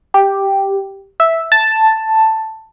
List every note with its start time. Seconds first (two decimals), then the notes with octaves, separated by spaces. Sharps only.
0.14 G4
1.20 E5
1.52 A5